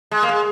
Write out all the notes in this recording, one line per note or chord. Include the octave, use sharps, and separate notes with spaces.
G#3
A#3
G#3